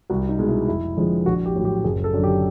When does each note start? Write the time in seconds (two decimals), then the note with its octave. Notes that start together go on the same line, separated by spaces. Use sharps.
0.10 C2 F#4
0.29 D#4
0.39 B2 G#3
0.49 E4
0.68 F1 E4
0.97 F2 D3 F3 G#3
1.26 A#1 F#4
1.46 G4
1.56 A2 F#3
1.65 G4
1.84 F#1 G#4
2.04 A4
2.14 F#2 D3
2.24 G4